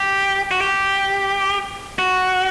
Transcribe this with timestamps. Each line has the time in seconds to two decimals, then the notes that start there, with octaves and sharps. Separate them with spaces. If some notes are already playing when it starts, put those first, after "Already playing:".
Already playing: G4
0.51 F#4
0.61 G4
1.99 F#4